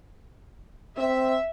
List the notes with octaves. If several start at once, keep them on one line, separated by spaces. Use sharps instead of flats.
C4 E5